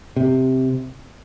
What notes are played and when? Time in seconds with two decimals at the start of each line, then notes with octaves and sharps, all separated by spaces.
0.17 C3